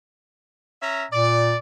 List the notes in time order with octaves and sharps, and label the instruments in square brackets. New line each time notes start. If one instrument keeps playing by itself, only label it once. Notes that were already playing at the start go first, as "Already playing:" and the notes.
[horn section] C#4 E5 A#5
[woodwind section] A#2 [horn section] D5